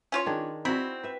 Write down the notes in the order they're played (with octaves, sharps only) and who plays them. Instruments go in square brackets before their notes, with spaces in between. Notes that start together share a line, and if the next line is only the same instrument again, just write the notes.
[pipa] C#4 F4 C#5
[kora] D#3 D4 G#4
[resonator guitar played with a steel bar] C4 [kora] E4 F#4 [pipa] B5
[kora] B4 E5